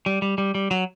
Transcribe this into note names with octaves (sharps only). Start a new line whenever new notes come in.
G3
G3
G3
G3
F#3